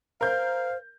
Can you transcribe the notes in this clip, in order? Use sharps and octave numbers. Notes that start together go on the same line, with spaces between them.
A#4 C5 F5 G6